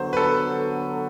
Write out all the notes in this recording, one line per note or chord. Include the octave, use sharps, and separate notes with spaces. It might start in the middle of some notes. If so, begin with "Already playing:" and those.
Already playing: D3 F#3 B3 C5
B4
A4